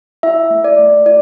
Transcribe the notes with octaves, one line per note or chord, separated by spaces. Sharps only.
E4 E5
A3
D5
A3
E4 D5